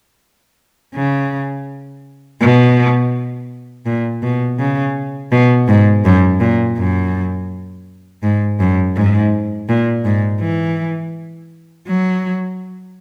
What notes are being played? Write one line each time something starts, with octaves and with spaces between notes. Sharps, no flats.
C#3
B2
A#2
B2
C#3
B2
G#2
F#2
A#2
F#2
G#2
F#2
G#2
A#2
G#2
E3
F#3